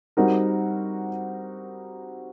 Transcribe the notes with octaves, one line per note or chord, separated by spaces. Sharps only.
G3 C4 D#4 F#4 A#4